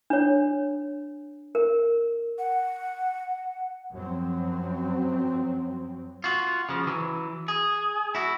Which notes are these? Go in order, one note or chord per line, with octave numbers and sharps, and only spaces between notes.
D4 C#5
A#4
F#5
F#2 F3 F#3 C4
F4 F#4
C#3 F3
E3 F#3
G#4
E4 F#4